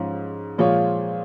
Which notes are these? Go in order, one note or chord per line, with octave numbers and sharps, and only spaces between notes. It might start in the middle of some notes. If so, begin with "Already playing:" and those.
Already playing: G#2 F3 C#4
A#2 F3 G#3 F4 C#5